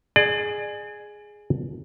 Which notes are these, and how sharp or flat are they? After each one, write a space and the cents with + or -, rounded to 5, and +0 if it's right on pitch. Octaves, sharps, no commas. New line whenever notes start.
G#4 +0 D5 +35